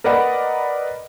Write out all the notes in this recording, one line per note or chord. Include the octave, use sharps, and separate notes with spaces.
A#4 B4 D5 D#5 F#5 B5